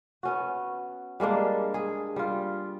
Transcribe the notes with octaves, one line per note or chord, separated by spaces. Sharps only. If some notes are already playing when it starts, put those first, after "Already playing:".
B3 C#4 F#4
G3 G#3 A#3 D4
G#4
G3 F4